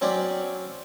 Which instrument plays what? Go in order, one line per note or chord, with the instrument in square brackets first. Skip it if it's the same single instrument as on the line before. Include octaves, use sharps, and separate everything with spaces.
[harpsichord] F#3 C4 C#4 D5